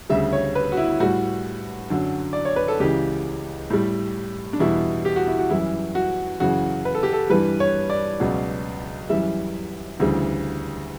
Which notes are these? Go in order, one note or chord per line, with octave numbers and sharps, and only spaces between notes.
D2 C#3 G3 E5
C#5
B4
F#4
E4
A2 G3 F#4
F#2 D3 F#3
D5
C#5
B4
A4
C#2 C#3 E3 G4
A2 G3
D4
E2 B2 G3 E4
G4
F#4
E4
F#4
F#2 E3 G3 E4
F#4
F#2 C#3 E3 F#4
B4
A4
G4
A4
G2 E3 G3 B4
C#5
D5
C#2 B2 F#3
F#2 E3 G3 E5
D2 C#3 E3 G3